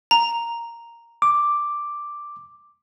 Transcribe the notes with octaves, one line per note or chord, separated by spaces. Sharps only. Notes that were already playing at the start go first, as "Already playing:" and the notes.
A#5
D6